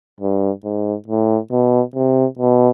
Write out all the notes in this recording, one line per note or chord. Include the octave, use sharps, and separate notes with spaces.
G2
G#2
A2
B2
C3
B2